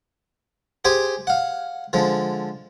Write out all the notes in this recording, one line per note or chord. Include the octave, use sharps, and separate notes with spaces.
G4 G#4 C5 G5 G#5
F5 F#5
D3 F3 G#3